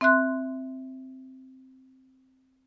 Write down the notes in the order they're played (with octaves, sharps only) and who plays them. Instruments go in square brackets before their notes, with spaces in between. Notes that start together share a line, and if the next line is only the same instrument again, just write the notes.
[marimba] C4 E5 C6 F#6